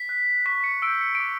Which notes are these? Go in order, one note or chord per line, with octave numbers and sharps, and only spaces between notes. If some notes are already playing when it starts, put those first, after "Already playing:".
Already playing: B6
F#6
C#6 B6
C#7
E6 G6 D7
C#7
D6 D7